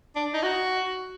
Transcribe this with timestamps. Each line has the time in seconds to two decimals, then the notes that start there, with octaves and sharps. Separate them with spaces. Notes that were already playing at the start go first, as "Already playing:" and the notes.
0.16 D4
0.34 D#4
0.43 F#4